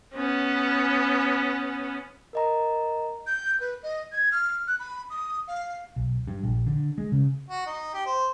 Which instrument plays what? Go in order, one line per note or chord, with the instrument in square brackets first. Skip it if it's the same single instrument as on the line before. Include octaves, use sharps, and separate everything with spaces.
[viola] B3 C#4
[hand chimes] A#4 D#5 A#5
[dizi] G6
B4
D#5
G#6
F6
F#6
B5
D#6
F5
[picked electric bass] B1
G2
A#1
D3
G#3
C#3
[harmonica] F#4
D#4
G4
C5